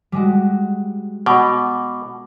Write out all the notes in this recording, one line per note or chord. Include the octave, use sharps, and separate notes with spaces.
G3 G#3 F#4
B2 D6